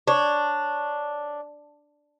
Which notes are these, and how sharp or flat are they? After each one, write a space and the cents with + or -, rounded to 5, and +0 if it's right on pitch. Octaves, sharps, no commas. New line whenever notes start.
D4 +0 C#5 +0